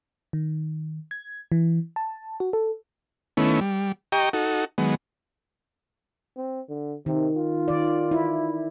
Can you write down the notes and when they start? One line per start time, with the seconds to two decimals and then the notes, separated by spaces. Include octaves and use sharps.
0.33 D#3
1.11 G#6
1.52 E3
1.96 A5
2.40 F#4
2.53 A4
3.37 D#3 A3 B3 C#4 E4
3.61 G3
4.12 G4 D#5 G5 A#5 C#6
4.33 D#4 F#4 A4
4.78 D#3 F#3 G#3 B3
6.36 C4
6.69 D3
7.06 C3 D#3
7.37 F4
7.68 D#3 D5
8.11 E4